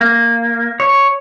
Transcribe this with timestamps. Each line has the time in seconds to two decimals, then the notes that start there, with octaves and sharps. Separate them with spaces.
0.01 A#3
0.80 C#5